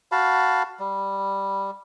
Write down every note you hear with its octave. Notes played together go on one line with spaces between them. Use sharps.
F#4 F5 A5 B5
G3